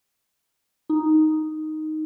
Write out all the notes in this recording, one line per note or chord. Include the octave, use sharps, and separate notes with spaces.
D#4